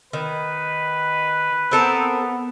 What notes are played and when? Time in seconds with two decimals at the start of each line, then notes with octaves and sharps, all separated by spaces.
0.13 D#3 B4
1.71 B3 C4 A4 A#4